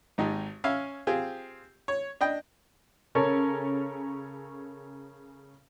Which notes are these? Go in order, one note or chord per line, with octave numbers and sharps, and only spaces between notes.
G#1 G#2 D#4 G4
C#4 E5 F5 G#5
C4 F4 G4 G#4
C#5
D4 D#5 G5
C#3 C#4 A4 A#4 C#5